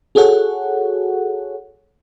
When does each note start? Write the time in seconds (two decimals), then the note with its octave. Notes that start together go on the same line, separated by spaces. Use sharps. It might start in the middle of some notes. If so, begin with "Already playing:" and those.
0.15 F#4 G#4 A4 C#5 F#5